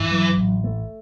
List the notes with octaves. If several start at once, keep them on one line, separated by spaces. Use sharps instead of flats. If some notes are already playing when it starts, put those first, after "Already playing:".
Already playing: G2 E3
F#3
A1
A3